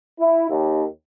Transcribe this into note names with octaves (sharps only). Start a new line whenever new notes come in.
E4
D#2